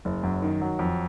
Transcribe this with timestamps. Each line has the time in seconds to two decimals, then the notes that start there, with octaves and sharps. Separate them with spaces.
0.05 F#1
0.23 F#2
0.42 D#3
0.61 F#3
0.79 F2